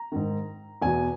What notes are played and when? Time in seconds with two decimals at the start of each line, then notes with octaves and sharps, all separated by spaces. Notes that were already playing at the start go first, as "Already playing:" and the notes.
Already playing: A#5
0.12 G#2 D#3
0.82 E2 B2 G#5